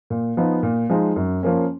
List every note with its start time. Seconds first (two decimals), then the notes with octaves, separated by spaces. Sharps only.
0.10 A#2
0.37 F3 B3 D#4
0.63 A#2
0.90 F3 G#3 D#4
1.16 F#2
1.43 F3 A#3 C#4